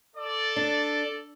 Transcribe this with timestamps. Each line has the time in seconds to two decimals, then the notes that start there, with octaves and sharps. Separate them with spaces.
0.16 A4 D5
0.56 D4